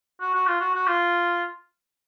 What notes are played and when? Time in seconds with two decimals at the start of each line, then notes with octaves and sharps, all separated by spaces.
0.21 F#4
0.34 F#4
0.47 F4
0.60 F#4
0.74 F#4
0.87 F4